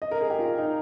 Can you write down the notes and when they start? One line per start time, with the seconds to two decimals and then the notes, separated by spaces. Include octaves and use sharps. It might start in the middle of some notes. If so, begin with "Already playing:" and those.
0.02 D#5
0.11 A#4
0.21 G#4
0.30 G4
0.39 F4
0.58 D#4